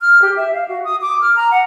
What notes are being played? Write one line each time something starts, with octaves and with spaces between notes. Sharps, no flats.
F6
G4
E5
F5
F#4
D#6
D6
F6
A#5
F#5